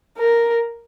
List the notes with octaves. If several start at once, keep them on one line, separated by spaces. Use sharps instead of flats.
A#4